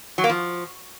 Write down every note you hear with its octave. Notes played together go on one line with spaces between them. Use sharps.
F#3
A#3
F3